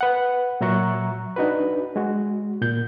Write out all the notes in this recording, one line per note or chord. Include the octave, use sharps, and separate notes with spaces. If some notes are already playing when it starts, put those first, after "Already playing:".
B4 F#5
A#2 F#3 E5 A#5 C#6 F#6
D4 D#4 F#4 B4
G#3 F#4
A#2 G6